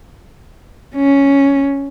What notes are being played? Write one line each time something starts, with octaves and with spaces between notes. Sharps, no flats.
C#4